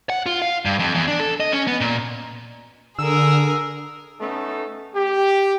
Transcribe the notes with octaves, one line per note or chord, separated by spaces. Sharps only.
F#5
F4
F5
G2
F2
E2
D4
A4
D#5
C#4
B3
A#2
D3 G#4 A#4 E6
A3 B3 C#4 D#4 A4
G4